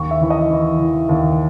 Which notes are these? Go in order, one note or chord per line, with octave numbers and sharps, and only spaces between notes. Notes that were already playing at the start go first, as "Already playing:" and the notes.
Already playing: D#2 C#6
E5
E3
D#5
E3
E3
D#2